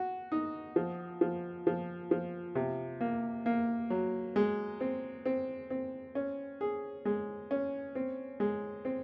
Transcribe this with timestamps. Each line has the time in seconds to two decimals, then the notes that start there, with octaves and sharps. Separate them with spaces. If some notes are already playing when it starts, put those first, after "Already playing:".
Already playing: F#4
0.32 D#4
0.76 F3
1.21 F3
1.67 F3
2.11 F3
2.55 C3
3.01 A#3
3.46 A#3
3.90 F#3
4.36 G#3
4.81 C4
5.26 C4
5.70 C4
6.15 C#4
6.61 G#4
7.05 G#3
7.51 C#4
7.95 C4
8.40 G#3
8.85 C4